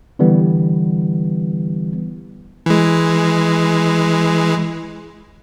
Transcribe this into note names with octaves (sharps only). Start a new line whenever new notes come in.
D3 E3 G3 B3
E3 G#3